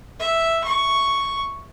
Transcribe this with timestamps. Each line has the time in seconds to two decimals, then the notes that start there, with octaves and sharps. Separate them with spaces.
0.19 E5
0.64 C#6